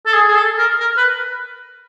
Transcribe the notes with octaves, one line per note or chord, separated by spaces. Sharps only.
A4
G#4
G#4
A4
A#4
A#4
B4